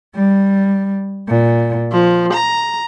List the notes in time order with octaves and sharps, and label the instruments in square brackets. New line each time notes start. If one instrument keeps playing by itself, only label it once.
[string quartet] G3
A#2
F3
A#5